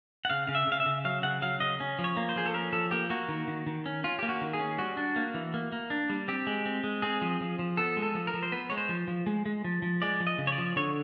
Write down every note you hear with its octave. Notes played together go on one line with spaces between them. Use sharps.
F#5
C#3 F5
C#3 F5
E5
C#3 F5
E5
C#3
F#3 F5
C#3 F#5
F#3 F5
C#3 D#5
C#4
F3
C#5
A#3
C5
F3 G#4
A4
C#4 A#4
F3 A4
A#3 G4
A#3 F#4
D#3
D#3
D#3
C#4
C#4 F4
A#3 G4
F#4
D#3
G#4
C#4
G3 F#4
D4
A#3
E3
A#3
A#3
D4
G3
C4 G4
G#3
C4
G#3
C4 G#4
F3
F3
F3
B3 A4
G#3
A4
F3
A#4
F3
C5
B3 B4
G#3 C#5
C5
F3
F3
G#3
G#3
F3
F3
G#3 D5
F3
D#5
C#3
C#5
D5
F3
D3 C#5